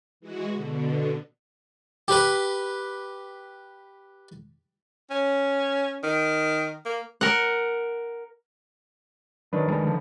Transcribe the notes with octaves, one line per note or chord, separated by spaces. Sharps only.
E3 G#3 F#4
B2 D3
G4 B4
C#4
D#3
A#3
A#4 F#5
D#3 F#3 D4 B4
F1 B2 G#3
D3 F3